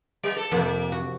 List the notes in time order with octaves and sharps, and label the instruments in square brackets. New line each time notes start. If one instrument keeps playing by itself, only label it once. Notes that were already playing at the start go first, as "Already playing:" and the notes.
[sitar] G3
A4
[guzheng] F2 C3 [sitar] A#3
[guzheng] F#4